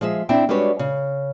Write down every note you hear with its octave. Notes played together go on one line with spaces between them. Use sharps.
F3 G#3 G#4 E5
C4 D4 E4 E5 G5
G3 G#3 D4 F#4 B4 C#5
C#3